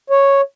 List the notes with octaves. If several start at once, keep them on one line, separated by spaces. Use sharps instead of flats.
C#5